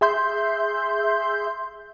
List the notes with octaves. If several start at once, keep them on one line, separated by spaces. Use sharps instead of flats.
G#4 E5 C6 G6